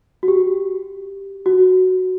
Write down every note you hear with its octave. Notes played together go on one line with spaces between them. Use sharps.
F#4
G4
F#4